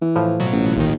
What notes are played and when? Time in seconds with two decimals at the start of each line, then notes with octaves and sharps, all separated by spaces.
0.01 E3
0.16 A2 F3
0.40 B2 F#3
0.52 A1
0.76 A#1 D#2 D#3